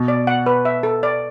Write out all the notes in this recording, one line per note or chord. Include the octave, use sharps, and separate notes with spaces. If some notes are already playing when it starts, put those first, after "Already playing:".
Already playing: B2
D5
F#5
B4
E5
A4
D5